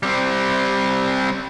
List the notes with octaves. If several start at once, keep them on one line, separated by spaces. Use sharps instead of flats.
G3 C4